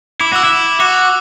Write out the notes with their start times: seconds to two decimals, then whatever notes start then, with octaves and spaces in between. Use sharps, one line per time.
0.21 E4 D6
0.33 F#4 E6
0.44 E4
0.80 F#4 D6